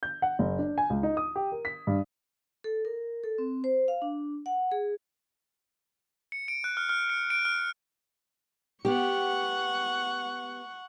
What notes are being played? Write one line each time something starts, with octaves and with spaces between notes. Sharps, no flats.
G6
F#5
F#1
D4
G#5
C#2
D#4
D#6
G4
A#4
B6
G2
A4
A#4
A4
C4
C5
F5
D4
F#5
G#4
C#7
D7
F#6
F6
F6
C#7
D7
F6
B3 G4 F#5 C#6